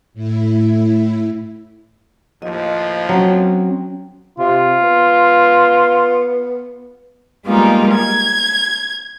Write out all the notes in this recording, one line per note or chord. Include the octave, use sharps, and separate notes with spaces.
A2 E4
D#2 A2 F3 D#5
F#3 C4 C#4 G5
C3 F4
B3
G3 G#3 A#3 B3 D#4 F4
G#6